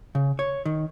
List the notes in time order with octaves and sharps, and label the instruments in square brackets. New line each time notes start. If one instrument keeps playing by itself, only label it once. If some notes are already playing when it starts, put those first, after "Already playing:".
[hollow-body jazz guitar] C#3
C#5
D#3